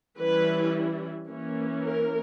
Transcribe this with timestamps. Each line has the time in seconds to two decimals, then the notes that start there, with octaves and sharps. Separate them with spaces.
0.18 E3 G3 C#4 E4 B4
1.30 E3 A#3 C#4
1.86 A#4